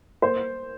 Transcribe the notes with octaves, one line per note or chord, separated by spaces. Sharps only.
A#3 C5